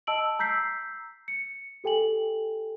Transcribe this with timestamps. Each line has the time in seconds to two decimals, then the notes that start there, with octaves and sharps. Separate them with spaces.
0.07 D#5 A5 E6 D7 F#7
0.39 A#5 E6 G6 B6 C7
1.28 C#7
1.84 G4 A4 G5 G#5 F#7